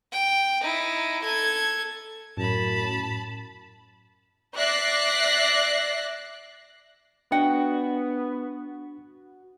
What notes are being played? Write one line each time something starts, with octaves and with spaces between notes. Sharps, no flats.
G5
D#4 E4
A4 G#6
F#2 A2 A5 B5
D5 E5 F#6 A#6 C7
B3 D4 F#4 D#5 F#5 G5